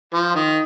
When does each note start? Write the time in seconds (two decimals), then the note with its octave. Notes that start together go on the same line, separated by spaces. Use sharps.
0.14 F3
0.35 D#3